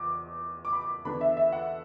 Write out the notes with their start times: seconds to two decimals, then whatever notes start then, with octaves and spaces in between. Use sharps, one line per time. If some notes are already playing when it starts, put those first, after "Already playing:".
Already playing: E2 D6
0.65 D6
0.73 B5
0.81 D6
1.05 E2 D3 B3 D4 B5
1.21 E5
1.37 E5
1.52 F#5